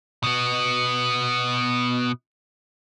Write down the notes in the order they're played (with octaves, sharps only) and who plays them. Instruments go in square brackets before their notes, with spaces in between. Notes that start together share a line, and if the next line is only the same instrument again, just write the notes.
[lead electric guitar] B2 B3